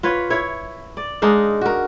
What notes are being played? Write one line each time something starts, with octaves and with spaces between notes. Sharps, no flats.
F4 B4 C#5
E4 C#5
D5
G#3 D4 D#4 F5
F#4 A#4